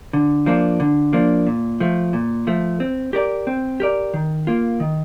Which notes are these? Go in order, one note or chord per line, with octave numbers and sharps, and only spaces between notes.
D3
F3 A#3 D4
D3
F3 A#3 D4
A#2
F3 A3
A#2
F3 A3
C4
G4 A#4 D5
C4
G4 A#4 D5
D#3
A#3 F4
D#3